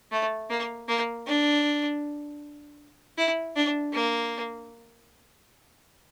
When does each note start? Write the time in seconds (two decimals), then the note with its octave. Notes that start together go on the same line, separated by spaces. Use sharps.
0.12 A3
0.50 A#3
0.88 A#3
1.27 D4
3.18 E4
3.56 D4
3.93 A#3